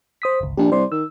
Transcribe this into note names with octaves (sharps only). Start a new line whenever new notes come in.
C5 D#6 B6
G1 C#2
A#1 D4 G4
C2 C5 D5 C6
D#3 E6